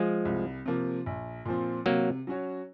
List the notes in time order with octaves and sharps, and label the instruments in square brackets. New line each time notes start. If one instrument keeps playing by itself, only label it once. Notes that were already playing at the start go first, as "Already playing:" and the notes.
Already playing: [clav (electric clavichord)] F3 G#3
[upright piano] C2
C3 F3 A#3
A#1
A#2 F3 C4
[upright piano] C3 [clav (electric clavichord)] F#3 A#3
[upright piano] F#3 C#4 F#4 C#5